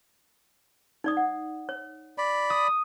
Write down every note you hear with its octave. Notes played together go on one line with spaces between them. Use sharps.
D#4 D5 D#6
F#5
C#5
D5 B5
D#6